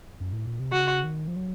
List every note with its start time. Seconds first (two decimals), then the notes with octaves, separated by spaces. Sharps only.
0.20 F#2
0.32 A2
0.47 A#2
0.60 C3
0.72 C#3 F#4
1.04 D#3
1.28 F3
1.36 F#3